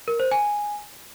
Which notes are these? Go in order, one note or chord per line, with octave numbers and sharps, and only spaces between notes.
A#4
C5
G#5